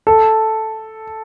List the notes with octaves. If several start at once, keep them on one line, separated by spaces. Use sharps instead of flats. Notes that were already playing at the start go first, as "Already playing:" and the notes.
A4